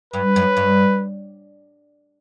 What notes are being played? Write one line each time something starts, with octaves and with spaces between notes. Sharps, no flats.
G2 B4
F#2
G2